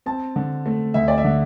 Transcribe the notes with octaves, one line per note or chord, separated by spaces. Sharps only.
C4 A5
D3
A3
D2 E5
D5
E5
D3